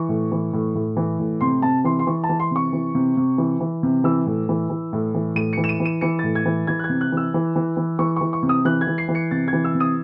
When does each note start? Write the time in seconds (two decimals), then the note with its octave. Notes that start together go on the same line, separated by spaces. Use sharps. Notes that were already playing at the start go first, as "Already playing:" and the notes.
Already playing: E3 C#6
0.09 A2
0.32 E3
0.53 A2
0.75 A2
0.97 E3
1.20 A2
1.41 C3 C6
1.62 C3 A5
1.84 E3 C6
1.99 C6
2.07 E3 C#6
2.24 A5
2.29 E3
2.40 C6
2.51 C3 C#6
2.73 E3
2.95 C3
3.17 C3
3.38 E3
3.61 E3
3.83 C3
4.04 E3 E6
4.26 A2
4.49 E3
4.70 E3
4.93 A2
5.15 E3
5.36 A2 D#7
5.53 E3 C#7
5.64 E7
5.69 D#7
5.80 E3
5.85 D#7
6.01 E3 C#7
6.19 A2 A6
6.35 G#6
6.46 E3
6.67 E3 G#6
6.79 F#6
6.84 G#6
6.90 C3
7.01 F#6
7.12 E3 E6
7.34 E3
7.56 E3
7.77 E3
7.99 E3 C#6
8.16 E3 C#6
8.33 C#6
8.43 C3
8.49 D#6
8.65 E3 F#6
8.81 G#6
8.87 E3
8.98 C7
9.09 E3
9.15 C#7
9.31 C3 A6
9.48 G#6
9.53 E3
9.64 E6
9.75 C3
9.80 D#6